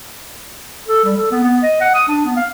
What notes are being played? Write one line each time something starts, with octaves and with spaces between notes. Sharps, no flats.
A4
G3
A4
B3
B3
D#5
F#5
D#6
D4
B3
F5